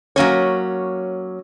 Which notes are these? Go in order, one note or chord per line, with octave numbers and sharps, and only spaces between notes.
F#3 A#3 C#4 C#5